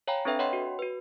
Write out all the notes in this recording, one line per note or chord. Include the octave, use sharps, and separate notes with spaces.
C#5 F5 G5 G#5 A#5 B5
C4 D4 A4 B4 E5 G5
C#5 D#5 F#5 G5 B5 C6
F#4
F#4 B4